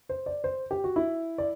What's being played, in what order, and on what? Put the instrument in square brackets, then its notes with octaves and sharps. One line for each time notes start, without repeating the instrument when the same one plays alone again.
[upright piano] C5
D5
C5
G4
F#4
E4
D5